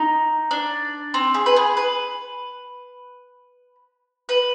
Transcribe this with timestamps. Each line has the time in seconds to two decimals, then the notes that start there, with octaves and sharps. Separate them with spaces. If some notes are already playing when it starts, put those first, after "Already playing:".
Already playing: D#4
0.51 D4
1.14 C4
1.34 G#4
1.46 B4
1.56 G#4
1.77 B4
4.29 B4